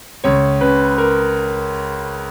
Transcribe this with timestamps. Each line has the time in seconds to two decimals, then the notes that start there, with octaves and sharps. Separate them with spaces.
0.24 C#2 C#5
0.61 C#3 B4
0.98 A#4